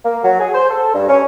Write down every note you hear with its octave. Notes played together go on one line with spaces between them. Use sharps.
A#3
F#3
G#4
C5
A4
G2
C#4